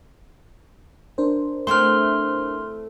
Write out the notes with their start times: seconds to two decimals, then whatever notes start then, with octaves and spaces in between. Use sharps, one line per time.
1.18 D4 A#4 C5
1.67 A3 C4 E4 C6 F6